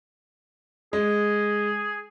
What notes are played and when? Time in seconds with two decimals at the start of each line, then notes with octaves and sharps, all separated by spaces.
0.93 G#3 G#4